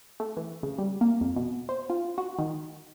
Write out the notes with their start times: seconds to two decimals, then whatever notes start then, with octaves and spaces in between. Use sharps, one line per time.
0.20 A3
0.37 E3
0.63 C#3
0.78 G3
1.01 A#3
1.21 F2
1.36 B2
1.69 C5
1.90 F4
2.18 F#4
2.39 D#3